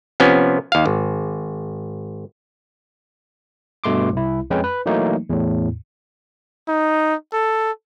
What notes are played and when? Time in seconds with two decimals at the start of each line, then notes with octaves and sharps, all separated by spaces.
0.20 C3 F3 B3 C#4
0.72 D#2 F5
0.86 G#1
3.84 G2 B2 A3 C6 D6
4.12 C2 E4
4.50 F2 G#3 C#4 B4 G5
4.64 B4
4.86 E3 F#3 A3 A#3 D#4
5.30 E2 A2
6.68 D#4
7.33 A4